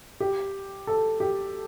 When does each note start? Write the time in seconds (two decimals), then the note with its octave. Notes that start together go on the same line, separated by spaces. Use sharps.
0.20 G4
0.87 A4
1.20 G4